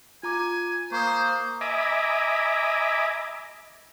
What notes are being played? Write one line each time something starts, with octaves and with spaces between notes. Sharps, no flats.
F4 G#5 A#5 D6
A#3 C5 C#6 D#6
D#5 E5 G#5 A#5 B5 D6